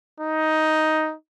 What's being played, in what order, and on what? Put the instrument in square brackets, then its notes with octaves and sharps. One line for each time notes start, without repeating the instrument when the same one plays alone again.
[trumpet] D#4